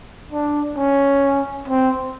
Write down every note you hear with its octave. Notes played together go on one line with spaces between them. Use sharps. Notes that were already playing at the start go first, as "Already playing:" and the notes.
D4
C#4
C4